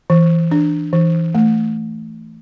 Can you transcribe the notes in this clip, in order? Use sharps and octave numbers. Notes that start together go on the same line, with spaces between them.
E3
D4
E3
A3